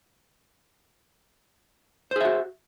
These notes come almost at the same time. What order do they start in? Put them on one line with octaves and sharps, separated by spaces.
C5 G#4 E5 F#4